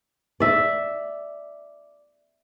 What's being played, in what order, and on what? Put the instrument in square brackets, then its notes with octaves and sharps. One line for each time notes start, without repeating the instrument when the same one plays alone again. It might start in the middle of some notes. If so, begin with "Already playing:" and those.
[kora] D5 E5